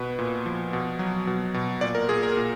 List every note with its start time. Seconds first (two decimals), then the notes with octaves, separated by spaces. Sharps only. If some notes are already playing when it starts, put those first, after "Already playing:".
Already playing: B2 B4
0.19 A#2
0.46 F3
0.73 B2
0.99 F#3
1.27 B2
1.54 B2
1.81 A#2 D5
1.95 A#4
2.09 A#2 G#4
2.23 A#4
2.37 A#2